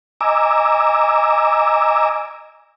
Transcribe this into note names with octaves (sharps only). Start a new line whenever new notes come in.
D#5 G#5 A#5 D6 E6